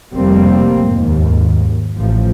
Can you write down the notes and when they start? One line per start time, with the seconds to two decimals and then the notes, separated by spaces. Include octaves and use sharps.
0.13 F1 G3 A#3 C4
0.89 D#2 G#2
1.96 A1 F3